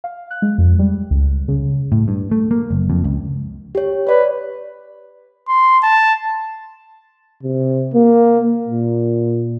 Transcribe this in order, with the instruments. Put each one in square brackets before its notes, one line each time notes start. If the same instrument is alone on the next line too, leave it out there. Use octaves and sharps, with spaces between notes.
[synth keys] F5
F#6
G#3
F2
G3
C#2
C#3
[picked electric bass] A2
G2
A3
A#3
F#1
F2
C#2
[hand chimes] G4 C#5
[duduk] B4 [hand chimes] C#5 D5
[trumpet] C6
A5
[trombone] C3
A#3
A#2